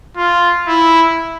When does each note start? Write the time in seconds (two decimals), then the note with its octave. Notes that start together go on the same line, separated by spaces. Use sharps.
0.17 F4
0.67 E4